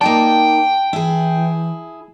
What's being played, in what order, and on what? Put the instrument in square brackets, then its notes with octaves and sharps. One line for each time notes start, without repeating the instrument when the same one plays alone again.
[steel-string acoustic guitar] A#3 D#4 D5 [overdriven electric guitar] G5 [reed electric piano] A5
[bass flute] E3 [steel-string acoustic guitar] E4 G#4